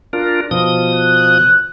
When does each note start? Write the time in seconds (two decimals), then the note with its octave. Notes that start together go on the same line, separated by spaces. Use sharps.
0.13 D4 F4 A#4
0.51 B2 F3 D#6
0.95 F#6